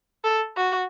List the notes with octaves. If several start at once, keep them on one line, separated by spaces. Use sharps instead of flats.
A4
F#4